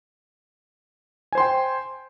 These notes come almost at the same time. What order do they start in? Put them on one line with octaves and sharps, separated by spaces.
G#5 C5 C6 G5